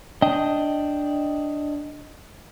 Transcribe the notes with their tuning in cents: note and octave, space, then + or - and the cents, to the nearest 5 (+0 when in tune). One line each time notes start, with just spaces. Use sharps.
D4 +0 D#5 +5 G5 +0